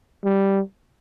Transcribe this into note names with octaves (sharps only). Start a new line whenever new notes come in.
G3